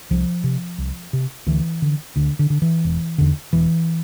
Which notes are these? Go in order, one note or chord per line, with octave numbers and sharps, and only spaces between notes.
C2 F3
C3
C2
C3
D2 E3
D3
D2 D3
D3
D3
E3
E1
E2 D3
E1 E3